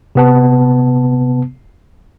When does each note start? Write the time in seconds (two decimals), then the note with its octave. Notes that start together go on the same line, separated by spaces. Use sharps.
0.15 C3 B3 A5